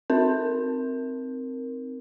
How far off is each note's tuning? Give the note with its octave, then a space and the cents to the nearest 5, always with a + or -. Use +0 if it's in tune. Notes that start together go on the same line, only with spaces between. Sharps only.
C4 +0 D#4 +0 A#4 +0